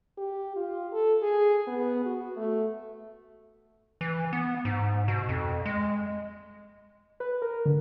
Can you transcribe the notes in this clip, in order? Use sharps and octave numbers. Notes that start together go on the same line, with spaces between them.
G4
F4
A4
G#4
B3
F#4
A3
E3
B3
G#2
B2
F2
G#3
B4
A#4
D3